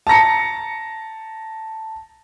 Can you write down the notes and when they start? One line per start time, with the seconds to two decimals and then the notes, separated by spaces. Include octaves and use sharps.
0.07 A5 A#5 A#6 C#7